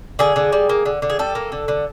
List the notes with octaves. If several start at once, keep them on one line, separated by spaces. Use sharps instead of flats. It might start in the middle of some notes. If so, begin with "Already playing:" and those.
D3 G#4
D3
G3
A#3
D3
D3
G#4
G3 A4
A#3
D3
D3